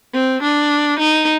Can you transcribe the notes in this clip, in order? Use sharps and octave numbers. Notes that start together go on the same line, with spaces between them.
C4
D4
D#4